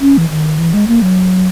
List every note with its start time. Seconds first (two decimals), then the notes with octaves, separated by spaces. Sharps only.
0.01 C#4
0.18 E3
0.30 D#3
0.59 E3
0.74 G#3
0.88 A#3
1.02 F#3